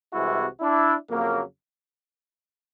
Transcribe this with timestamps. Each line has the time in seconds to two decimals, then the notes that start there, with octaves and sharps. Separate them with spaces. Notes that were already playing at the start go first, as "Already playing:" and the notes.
0.13 C2 C3 E3 G#3 E4 F#4
0.61 D4 E4
1.07 F2 C#3 F#3 A#3